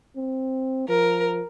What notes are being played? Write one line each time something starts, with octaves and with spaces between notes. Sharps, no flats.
C4
F3 A#4